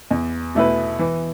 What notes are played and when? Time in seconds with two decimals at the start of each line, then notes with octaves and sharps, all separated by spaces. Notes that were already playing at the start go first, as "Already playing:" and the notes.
0.11 E2
0.55 B2 A3 E4 B4
0.99 E3